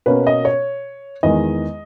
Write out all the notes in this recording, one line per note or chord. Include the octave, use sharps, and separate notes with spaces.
B2 A#3 C#4 B4
D#5
C#5
E2 D#3 G#3 D#5